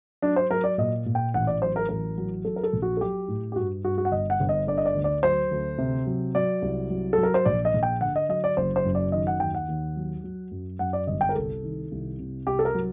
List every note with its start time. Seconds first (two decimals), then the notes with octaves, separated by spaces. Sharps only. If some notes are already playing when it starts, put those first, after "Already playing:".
0.22 F#3 D4
0.36 C5
0.50 F#3 A#4
0.64 D5
0.78 A#2 D#5
1.06 A#2
1.15 G5
1.34 A1 F#5
1.47 D5
1.61 F#3 C5
1.76 A#4
1.89 A1 A#4
2.17 F#3
2.45 F#3 A4
2.56 A#4
2.63 A4
2.73 A#1
2.82 F#4
2.97 A4
3.01 F#3 G4
3.28 A2
3.52 G4
3.56 G2 F#4
3.85 G2 F#4
3.98 F#4
4.05 F#5
4.12 G1 D#5
4.30 F#5
4.40 G1
4.49 D#5
4.67 D3 D5
4.78 D#5
4.86 D5
4.95 D2
5.04 D5
5.23 F#3 C5
5.51 D2
5.78 C3
6.06 F#3
6.35 F#3 D5
6.62 C2
6.90 F#3
7.13 F#3 A4
7.23 A#4
7.34 C5
7.45 A#1 D5
7.65 D#5
7.74 A#1
7.83 G5
8.01 D3 F#5
8.16 D#5
8.29 F#3 D#5
8.44 D5
8.57 F#1 C5
8.76 C5
8.85 F#2
8.95 D5
9.12 D#3 D#5
9.27 F#5
9.40 D#2 G5
9.55 F#5
9.69 D#2
9.96 F#3
10.24 F#3
10.51 F#2
10.79 F#2 F#5
10.93 D5
11.07 G1 D#5
11.21 G5
11.29 A#4
11.35 C2 A4
11.63 D#3
11.92 C2
12.19 C3
12.46 C2 G4
12.59 A4
12.65 A#4
12.74 F#3